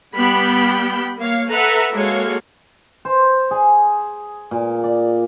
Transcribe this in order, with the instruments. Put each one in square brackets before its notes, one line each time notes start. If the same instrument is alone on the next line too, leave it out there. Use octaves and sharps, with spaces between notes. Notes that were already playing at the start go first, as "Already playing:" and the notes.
[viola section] G3 B3 G5 B5
A#3 C#5 F5
A4 B4 E5 F#5 A#5
G#3 A#3 F#4 A4 C#5 F5
[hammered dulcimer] C5
G#4
A#2
D5